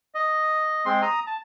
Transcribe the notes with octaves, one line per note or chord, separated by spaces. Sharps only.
D#5
G#3 C4 C6
A#5 D#6
A5